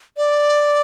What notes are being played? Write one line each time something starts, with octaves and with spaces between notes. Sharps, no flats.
D5